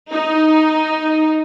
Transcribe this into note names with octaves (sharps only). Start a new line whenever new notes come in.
D#4